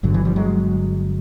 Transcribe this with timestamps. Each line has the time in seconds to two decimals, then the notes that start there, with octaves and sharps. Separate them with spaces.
0.03 G1 G2 D3 F#3
0.14 E3 F#3
0.25 F3 G3
0.36 F#3 G#3